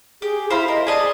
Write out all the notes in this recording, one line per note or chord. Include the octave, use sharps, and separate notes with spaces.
G4 G#4
E4 C5 F5 B5
A#4 D#5
G#4 D5 D#5 A5